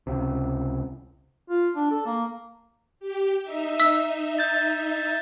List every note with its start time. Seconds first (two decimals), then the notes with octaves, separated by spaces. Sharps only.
0.07 C#2 C3
1.49 F4
1.76 D4
1.91 A4
2.06 A#3
3.00 G4
3.42 D#4 E5
3.80 E6 B6
4.39 G6 A6